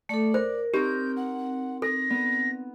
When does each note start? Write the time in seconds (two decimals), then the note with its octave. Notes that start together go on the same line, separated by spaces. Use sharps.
0.09 A3 A4 D5
0.34 A#4 C5
0.74 C4 D#4 G4 A#4 G6
1.16 F#5
1.82 A4 A#6
2.10 B3